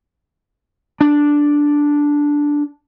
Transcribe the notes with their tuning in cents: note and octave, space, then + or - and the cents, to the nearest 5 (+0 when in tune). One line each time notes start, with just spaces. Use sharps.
D4 -5